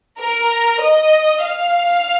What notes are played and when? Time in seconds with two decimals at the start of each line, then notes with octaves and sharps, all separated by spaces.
0.19 A#4
0.81 D#5
1.43 F5